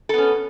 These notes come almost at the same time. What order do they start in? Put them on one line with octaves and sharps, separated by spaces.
A4 B3 C#4